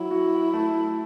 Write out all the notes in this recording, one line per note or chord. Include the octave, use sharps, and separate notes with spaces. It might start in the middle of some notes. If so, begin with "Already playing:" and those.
Already playing: F#3 E4
F#4
A3